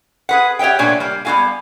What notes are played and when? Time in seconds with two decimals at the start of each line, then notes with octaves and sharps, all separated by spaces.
0.29 G#4 B4 F#5
0.59 G4 C#5 E5 F#5 G5
0.79 A#2 A3 D4 B4 C#5 G#5
1.00 G3 A#3
1.25 G3 B3 C4 F#4 F5 G#5